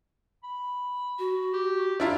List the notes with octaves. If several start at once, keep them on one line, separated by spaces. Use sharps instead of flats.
B5
F#4
G4
D4 E4 F4 A#5